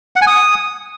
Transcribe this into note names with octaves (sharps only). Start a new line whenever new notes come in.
F#5
G#5
D#6